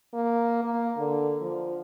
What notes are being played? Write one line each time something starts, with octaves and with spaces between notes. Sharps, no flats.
A#3
A#3
D3
F3